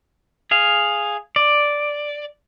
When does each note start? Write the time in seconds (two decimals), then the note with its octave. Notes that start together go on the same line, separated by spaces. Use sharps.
0.51 G#4 F5
1.36 D5